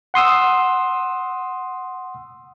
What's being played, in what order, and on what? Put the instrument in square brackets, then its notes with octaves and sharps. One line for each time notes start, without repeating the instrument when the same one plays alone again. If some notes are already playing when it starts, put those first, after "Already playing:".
[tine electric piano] F#5 C6 D#6 E6